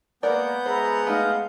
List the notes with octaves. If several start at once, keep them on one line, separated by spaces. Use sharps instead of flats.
G#3 A#3 B3 A#4 D5 F#5 G#5 G6
G#3 C5 E5 A#5 B5
A3 D#4 D#5 F5